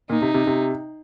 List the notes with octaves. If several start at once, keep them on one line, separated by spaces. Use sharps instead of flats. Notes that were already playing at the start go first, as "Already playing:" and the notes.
A#2 D#4
C3
C3
C3